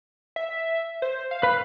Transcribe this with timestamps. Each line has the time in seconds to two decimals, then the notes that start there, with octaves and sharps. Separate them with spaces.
0.36 E5
1.02 C5
1.31 F5
1.43 B4 B5